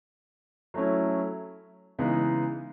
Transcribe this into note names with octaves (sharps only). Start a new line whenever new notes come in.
F#3 A3 C#4 E4
C#3 E3 G#3 B3 D#4